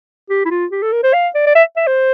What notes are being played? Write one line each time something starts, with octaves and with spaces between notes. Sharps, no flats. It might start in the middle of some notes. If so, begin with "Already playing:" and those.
G4
E4
F4
G4
A4
A#4
C5
F5
D5
D5
E5
E5
C5